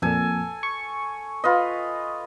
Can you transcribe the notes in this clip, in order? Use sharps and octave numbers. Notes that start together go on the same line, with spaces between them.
F2 A#2 A4 G#5
C#6
F4 B4 D#5